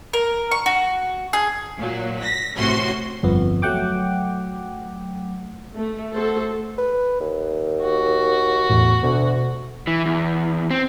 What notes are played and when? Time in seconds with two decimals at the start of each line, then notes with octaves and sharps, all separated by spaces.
0.13 A#4
0.51 C#6
0.66 F#4
1.33 G#4
1.77 A#2 F#3
2.21 A#6 B6
2.53 A1 A2 C3 C#4 F#4 C6
3.23 G1 F2 B3
3.62 F#3 A3 F#5 G5 D6
5.77 A3
6.12 A3 F#4 A4 C5
6.78 B4
7.20 D#2
7.82 F#4
8.70 E2 A2
9.03 D2 B2
9.87 E3
10.06 E2
10.71 C4